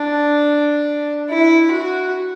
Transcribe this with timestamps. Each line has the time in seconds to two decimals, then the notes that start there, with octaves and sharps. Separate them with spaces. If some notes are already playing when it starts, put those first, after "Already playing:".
Already playing: D4
1.30 E4
1.72 F#4